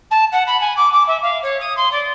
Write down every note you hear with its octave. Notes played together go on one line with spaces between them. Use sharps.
A5
F#5
B5
G#5
D6
D6
E5
F5
C#5
D#6
C6
D5